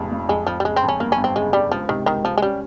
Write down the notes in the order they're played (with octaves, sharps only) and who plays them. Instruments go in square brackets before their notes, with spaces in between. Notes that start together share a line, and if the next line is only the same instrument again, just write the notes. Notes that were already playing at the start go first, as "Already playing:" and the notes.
Already playing: [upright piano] F1 F2 A#2 C#3
F1
[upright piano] F2 [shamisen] G#3
[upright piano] F2 [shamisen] F3
[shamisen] G3
[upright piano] C#3 [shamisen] G#3
[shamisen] C4
[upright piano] F2
[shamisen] C#4
[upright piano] G1 [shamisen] A#3
[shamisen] C#4
[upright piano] G1
[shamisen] C4
[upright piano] C#3 [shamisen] G#3
[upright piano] G1 [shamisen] G3
[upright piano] C#2 [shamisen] F3
[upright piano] C3 [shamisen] D#3
[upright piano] C#2 [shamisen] D#3
[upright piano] C#2 [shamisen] F3
[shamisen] G#3
[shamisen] G3 [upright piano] C#4